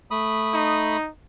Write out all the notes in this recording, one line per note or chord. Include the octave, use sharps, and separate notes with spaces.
A3 B5 D#6
D#4